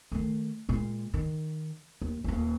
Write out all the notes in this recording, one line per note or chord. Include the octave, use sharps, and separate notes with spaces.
D#3 A3
A#2 G#3
D#3
D#2
D#1 A#3